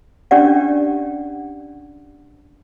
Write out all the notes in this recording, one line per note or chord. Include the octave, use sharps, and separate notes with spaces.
C#4 D4 G4 D5 F#5